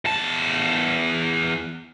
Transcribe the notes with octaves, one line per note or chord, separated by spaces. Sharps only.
E2 A5